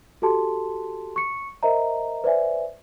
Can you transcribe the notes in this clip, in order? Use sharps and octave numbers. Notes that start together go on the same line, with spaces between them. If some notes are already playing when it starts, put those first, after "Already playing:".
F#4 G4 A4 A5 C6
C#6 C#7
A#4 C5 D#5 E5 A#5
B4 C5 D5 E5 G#5